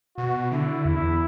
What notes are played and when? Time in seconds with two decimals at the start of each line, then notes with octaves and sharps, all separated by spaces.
0.17 B2 F#4
0.52 D3 E4
0.85 E2 E4